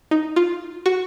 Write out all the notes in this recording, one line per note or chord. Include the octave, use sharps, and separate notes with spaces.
D#4
F4
F#4